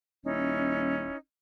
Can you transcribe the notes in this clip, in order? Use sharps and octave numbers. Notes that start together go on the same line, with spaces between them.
D#1 C#4 D#4 E4